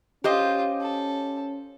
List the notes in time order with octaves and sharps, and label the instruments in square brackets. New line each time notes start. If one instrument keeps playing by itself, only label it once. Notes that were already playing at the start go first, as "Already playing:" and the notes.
[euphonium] C#4 [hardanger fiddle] F4 [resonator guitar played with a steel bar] G4 C5 D#5
[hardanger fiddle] A4